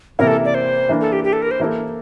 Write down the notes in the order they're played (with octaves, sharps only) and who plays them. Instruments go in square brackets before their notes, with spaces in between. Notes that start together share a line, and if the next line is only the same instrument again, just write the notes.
[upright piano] C3 E3 A#3 E4 [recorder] A#4
[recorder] A4
D5
C5
[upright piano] E3 A#3 D4
[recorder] A4
G4
G4
A4
A#4
C5
[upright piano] E3 A#3 E4 A4